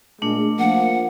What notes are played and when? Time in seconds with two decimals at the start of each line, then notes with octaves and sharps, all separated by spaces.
0.22 A#2 G#3 A3 D4
0.59 F3 A#3 F#5